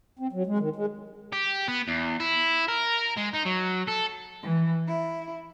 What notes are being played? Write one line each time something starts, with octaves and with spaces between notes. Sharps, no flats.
C4
F#3
G#3
D#3
G#3
G4
B3
E2
E4
A#4
G#3
D#4
F#3
A4
E3
E4